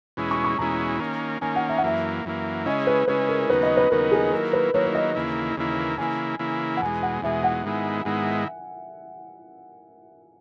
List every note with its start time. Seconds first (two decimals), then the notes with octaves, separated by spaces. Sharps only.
0.17 E2 B2 G#3 C#4 E4
0.31 C#6
0.44 C#6
0.58 E2 B2 G#3 C#4 E4 A#5
1.00 D#3 A#3 C#4
1.41 D#3 A#3 C#4 G#5
1.55 F#5
1.69 E5
1.77 F#5
1.83 F#2 E3 A#3 E5
2.25 F#2 E3 A#3
2.66 C#3 G#3 C#4 E4 D#5
2.87 B4
3.07 C#3 G#3 C#4 E4 B4
3.28 A#4
3.49 D#2 C#3 F#3 B3 D#4 B4
3.63 D#5
3.77 B4
3.90 D#2 C#3 F#3 B3 D#4 A#4
4.12 G#4
4.32 D#3 F#3 A#3 E4 A#4
4.53 B4
4.74 D#3 F#3 A#3 E4 C#5
4.85 C#5
4.95 D#5
5.15 D#2 C#3 E3 A#3 E4
5.57 D#2 C#3 E3 A#3 E4
5.98 C#3 E3 A#3 E4 G#5
6.39 C#3 E3 A#3 E4
6.76 F#5
6.81 E2 B2 G#3 G#5
7.02 F#5
7.22 E2 B2 G#3 E5
7.43 F#5
7.64 G#2 D#3 G#3 B3 E4
8.05 G#2 D#3 G#3 B3 E4